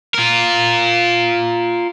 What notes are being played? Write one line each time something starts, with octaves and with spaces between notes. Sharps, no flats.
F4 A#4